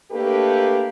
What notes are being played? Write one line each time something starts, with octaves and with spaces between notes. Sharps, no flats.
A3 A#3 D4 G4 A4 B4